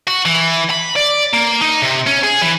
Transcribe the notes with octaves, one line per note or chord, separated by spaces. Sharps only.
F#4
E3
B5
D5
A#3
D#4
C3
C#4
G#4
E3